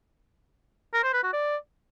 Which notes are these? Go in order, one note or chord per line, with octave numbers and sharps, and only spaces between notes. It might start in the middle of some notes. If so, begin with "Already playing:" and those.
A#4
C5
B4
F#4
D5